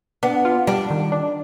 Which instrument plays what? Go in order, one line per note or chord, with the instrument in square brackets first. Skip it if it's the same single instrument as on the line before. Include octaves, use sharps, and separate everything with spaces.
[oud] B3 [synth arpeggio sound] D4
[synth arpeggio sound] F4
[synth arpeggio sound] G3 [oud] D4
[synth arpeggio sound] D#3
D4